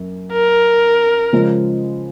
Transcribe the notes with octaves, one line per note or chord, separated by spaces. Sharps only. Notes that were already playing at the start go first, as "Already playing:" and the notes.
Already playing: F#2
A#4
C#3 F3 G#3 C#4